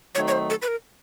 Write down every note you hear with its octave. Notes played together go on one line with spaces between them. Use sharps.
D#3 F#3 A3 C4 D#4 C#5
C#5
C5
A4
B4
A#4